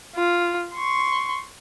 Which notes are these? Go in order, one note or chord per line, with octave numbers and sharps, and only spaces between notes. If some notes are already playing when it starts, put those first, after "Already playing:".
F4
C6 C#6